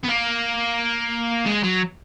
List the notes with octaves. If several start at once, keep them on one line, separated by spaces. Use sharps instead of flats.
B3
A#3
G#3
F#3